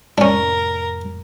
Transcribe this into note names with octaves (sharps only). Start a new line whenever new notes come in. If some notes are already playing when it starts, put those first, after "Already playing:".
F1 A2 C#4 D4 A#4